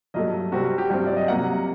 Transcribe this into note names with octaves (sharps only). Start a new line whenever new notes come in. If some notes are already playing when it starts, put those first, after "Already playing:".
G2 F#3 A3 D#5
C3 G3 C4 F#4
F#4
G4
G2 F#3 C4 G4
D5
D#5
C3 F#3 A#3 F#5